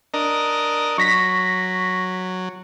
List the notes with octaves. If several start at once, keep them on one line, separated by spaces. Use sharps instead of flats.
D4 A#4 D#5
F#3 C#6 A#6 B6